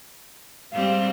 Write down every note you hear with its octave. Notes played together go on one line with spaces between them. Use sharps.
G#2 G3 C4 F5